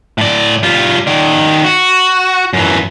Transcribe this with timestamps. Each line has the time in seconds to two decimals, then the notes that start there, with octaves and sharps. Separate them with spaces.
0.18 A2 D5
0.63 G3 F4
1.07 D#3 D5
1.64 F#4
2.53 F#2 E3